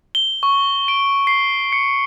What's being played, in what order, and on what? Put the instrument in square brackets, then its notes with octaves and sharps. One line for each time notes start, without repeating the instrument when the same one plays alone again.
[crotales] G7
C#6
D7
C7
C#7